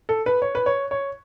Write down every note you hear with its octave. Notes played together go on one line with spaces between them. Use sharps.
A4
B4
C#5
B4
C#5
C#5